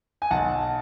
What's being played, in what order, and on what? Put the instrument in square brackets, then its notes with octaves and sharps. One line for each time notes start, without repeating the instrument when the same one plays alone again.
[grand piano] G#5
B1 F#5 A5